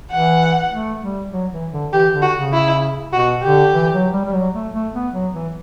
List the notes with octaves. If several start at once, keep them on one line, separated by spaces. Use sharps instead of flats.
E3 F#5
A3
G3
F#3
E3
D3
E3 G4
D3
F#4
C#3
E4
B2 F#4
D3 G4
E3
F#3
G3
G3
F#3
A3
A3
B3
F#3
E3